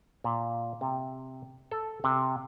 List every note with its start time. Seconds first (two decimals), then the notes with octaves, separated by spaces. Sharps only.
0.24 A#2
0.81 C3
1.71 A4
2.04 C3